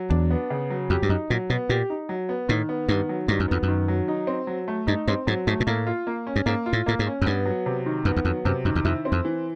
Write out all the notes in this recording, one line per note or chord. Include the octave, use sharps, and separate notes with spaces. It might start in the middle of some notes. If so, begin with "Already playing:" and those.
Already playing: F#3
E2 D4
B3
C#3
F#3
F2 G4
G2
F#2 D#4
A#2 F#3
B2 B3
A#2 G4
D#4
F#3
B3
A2 D#3
B3
G2 D#3
F#3
G2 D#3
F#2
F2 B3
F#2
D#3
F#3
D#4
C4
F#3
A3
G2 D#4
G2 C4
G#2 F#3
G#2 A3
A#2
A2 A#3
F4
A#3
C#4
G2
G#2 A#3
F4
A2
A2 A#3
G#2
C#4
F#2
G2 B3
F#3
C3
D#3
F#2 B3
E2
F2 F#3
F#2 C3
F#2 D#3
E2
F2 E4
C4
F2
E3